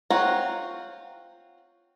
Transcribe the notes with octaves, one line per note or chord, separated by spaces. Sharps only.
C4 F4 C#5 F#5 A#5